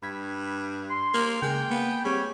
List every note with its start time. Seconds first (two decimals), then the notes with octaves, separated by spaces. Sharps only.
0.03 G2 B5 G#6 B6
0.90 C6
1.14 A#3
1.42 C#3 G#3 G5
1.70 A#3 B3 F5 G#5
2.05 G3 C4 G#4 C#5